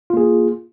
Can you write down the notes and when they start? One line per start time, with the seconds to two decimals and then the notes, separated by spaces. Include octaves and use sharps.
0.10 F4
0.14 A#3
0.17 G#4